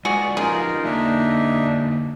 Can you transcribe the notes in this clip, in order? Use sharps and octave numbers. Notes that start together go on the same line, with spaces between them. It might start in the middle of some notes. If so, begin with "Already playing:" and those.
G#3 F4 F#4 G#4 D5
F3 C#4 D#4 F4 G4 G#4 A#4
D3 A#3 D4 D#4 E5